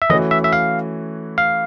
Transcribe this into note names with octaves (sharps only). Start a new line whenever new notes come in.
E5
E3 A3 C#4 F#4 D#5
E5
E5
F5
F5